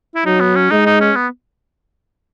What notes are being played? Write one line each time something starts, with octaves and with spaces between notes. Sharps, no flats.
E4
F#3 D#4
B3
C#4
G#3 D#4
D#4
C#4
B3